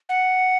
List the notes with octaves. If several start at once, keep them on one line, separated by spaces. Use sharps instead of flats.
F#5